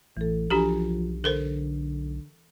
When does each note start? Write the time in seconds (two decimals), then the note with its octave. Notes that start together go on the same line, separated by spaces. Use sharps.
0.17 A1 A2 E3 A4
0.50 B1 F3 D4 F#4 G4 G#5 A#5
1.24 D3 A4 A#4 C5